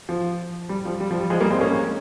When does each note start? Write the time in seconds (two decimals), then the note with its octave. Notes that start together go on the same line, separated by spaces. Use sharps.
0.09 F3
0.69 G3
0.85 F3
1.00 G3
1.11 F3
1.20 G3
1.30 F3 G#3
1.41 G3 A#3
1.50 G#3 C4
1.61 A#3 C#4